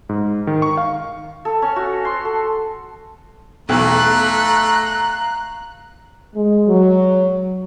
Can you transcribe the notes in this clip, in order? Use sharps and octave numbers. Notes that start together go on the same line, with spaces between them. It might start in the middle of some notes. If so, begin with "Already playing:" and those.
G#2
D#3
C#6
F5
A4
C#4
F#4
C6
A4
B1 E2 A3 F5 A#5 F#6
G#3
F#3